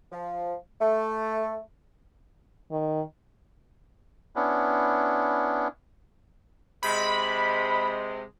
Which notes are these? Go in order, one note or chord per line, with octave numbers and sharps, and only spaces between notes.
F3
A3
D#3
B3 C#4 D4 E4
C3 G#3 B5